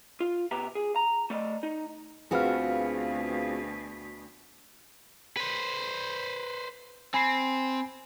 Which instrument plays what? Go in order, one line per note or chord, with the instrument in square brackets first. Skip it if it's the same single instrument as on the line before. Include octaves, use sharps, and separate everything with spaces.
[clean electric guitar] F4
B2 B3 G4 E5 A#5
G#4
A#5
A3 D5 D#5
D#4
[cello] D2 B2 [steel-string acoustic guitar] C4 F4 F#4 [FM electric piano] G#4 B4 F5
[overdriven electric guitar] B4 C5
[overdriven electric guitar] C4 [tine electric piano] G#5 B5 C7